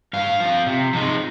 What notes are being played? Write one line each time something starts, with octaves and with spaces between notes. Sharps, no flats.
G2 F5
F3 C4
C3
F3 G#3 D#4